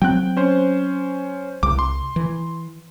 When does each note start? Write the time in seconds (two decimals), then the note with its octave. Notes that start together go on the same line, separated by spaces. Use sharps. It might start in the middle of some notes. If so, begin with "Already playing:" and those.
0.02 F#3 C4 G5 F#6
0.37 C#4 C5
1.63 C2 D6
1.79 C6
2.16 E3